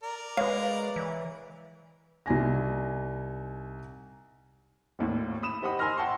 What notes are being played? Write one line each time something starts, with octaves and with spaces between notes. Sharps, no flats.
A#4 D5
G#3 B4 C#5 F5
E3
C2 D#4 G#5 A#6
G#1 D#2 A2
B5 D#6 E7
G4 C5 D#5 F#5 B5 D#6
G#5 A#5 C6 E6 F6 A#6
F#5 G5 A5 C6 C#6